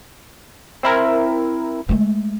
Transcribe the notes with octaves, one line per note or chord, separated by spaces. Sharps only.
C4 E4 A#4
G#3 A3